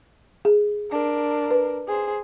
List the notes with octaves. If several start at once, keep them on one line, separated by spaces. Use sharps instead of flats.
G#4
D4 A#4
B4
G#4 C5